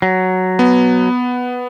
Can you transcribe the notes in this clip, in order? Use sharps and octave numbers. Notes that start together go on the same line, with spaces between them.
F#3
B3